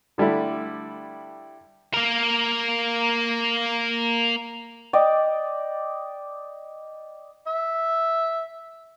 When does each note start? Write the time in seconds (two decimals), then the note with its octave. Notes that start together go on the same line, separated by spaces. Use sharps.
0.18 D3 G3 A3 E4
1.94 A#3 A#4
4.93 D5 D#5 G5 D6
7.47 E5